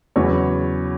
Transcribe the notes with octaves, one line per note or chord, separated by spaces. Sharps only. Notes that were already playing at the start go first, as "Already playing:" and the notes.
E2 C#3 F#3 B3 C#5